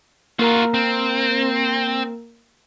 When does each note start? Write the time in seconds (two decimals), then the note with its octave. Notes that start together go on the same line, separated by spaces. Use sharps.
0.39 A#3 F4 F#4 A#4 A#5
0.74 C4